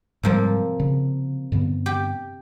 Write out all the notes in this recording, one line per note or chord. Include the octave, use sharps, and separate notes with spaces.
G#2 C3 F3 G3 G#3 A#3
C#3
G2 D3 B3
G4